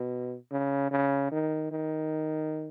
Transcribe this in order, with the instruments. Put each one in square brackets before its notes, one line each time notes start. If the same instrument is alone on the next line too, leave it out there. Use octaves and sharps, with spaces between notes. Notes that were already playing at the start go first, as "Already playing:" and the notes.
Already playing: [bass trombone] B2
C#3
C#3
D#3
D#3